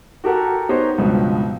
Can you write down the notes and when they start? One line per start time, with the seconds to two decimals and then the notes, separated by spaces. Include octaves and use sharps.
0.24 F#4 G4 A4 A#4 F#5
0.69 B3 D#4 G4 C5 C#5 D#5
0.98 C#2 G2 B2 F3 B3